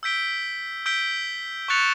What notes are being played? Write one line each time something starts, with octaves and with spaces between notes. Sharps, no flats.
E6 G6 B6 D7 G7
E6 G6 B6 D7 G7
C#6 F#6 A6 C#7 F7